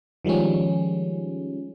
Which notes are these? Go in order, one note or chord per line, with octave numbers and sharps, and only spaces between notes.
D#3 F3 G3 G#3 C#4